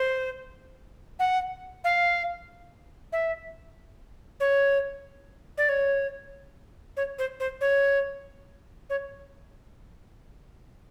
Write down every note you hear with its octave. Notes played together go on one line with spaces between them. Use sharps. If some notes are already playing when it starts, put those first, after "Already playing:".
Already playing: C5
F#5
F5
E5
C#5
D5
C#5
C#5
C5
C5
C#5
C#5